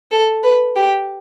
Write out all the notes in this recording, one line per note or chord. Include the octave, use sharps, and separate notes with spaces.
A4
B4
G4